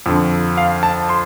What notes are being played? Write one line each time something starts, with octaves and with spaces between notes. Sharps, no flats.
F2 D3
F5
A5
C6